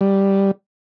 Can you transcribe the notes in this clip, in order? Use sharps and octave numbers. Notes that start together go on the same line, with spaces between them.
G3